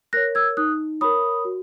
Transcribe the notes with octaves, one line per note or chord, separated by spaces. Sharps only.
A#4 C#5 F#6 A#6
E6 G#6
D#4 D#6 F#6
A#4 C#5 B5 D#6
F#4